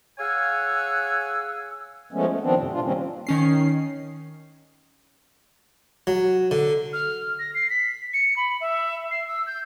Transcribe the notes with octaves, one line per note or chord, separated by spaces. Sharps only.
G#4 C#5 F5 F#5 G#5 E6
F3 G#3 A3 B3 C#4
A3
D#3 F3 B3 C4 D4
F#2 A2 C3
A#2 D4 F4
D#3 G3 A#3 C4 C#4
D#3 C#4 C7
F#3
D3
F6
A#6
C7
B6
C#7
B5
E5
C7
E6
G6